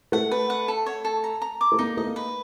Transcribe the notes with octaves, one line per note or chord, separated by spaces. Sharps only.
A3 F#5
B4
F#5
A4
C#5
A4
A#5
A#5
D6
A3
A#3 D#4
A3 D#5
A#3
B4